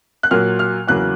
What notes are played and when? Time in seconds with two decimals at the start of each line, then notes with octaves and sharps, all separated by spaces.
0.23 F#6
0.31 A#2 F#3 A#3 F6
0.59 F6
0.88 E2 C#3 F#3 A#3 F#6